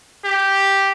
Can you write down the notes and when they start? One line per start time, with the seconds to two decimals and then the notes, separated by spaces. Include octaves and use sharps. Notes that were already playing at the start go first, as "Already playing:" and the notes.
0.25 G4